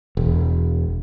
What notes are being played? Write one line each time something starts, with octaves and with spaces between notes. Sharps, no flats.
E1